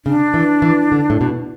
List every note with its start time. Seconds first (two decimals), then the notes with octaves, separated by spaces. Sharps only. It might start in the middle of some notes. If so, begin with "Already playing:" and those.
0.05 C#3 D4
0.34 E3
0.62 E3
0.92 D3
1.10 A2
1.21 B2